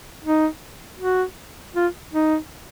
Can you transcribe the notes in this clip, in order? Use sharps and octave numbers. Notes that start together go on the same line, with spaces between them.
D#4
F#4
F4
D#4